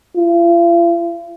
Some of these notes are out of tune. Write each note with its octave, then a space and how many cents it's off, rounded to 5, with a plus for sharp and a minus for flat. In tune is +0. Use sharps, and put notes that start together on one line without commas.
F4 -45